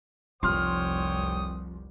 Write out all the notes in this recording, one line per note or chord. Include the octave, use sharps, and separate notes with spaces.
F1 C2 F3 C#5 G5 C6 D#6 F6